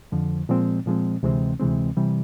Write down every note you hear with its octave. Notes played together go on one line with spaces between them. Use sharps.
F2 D3 F3
A#2 F3 G#3 C4
A#2 F3 G#3 C4
D2 C3 E3 G#3 C4
D2 C3 E3 G#3 C4
C3 E3 G3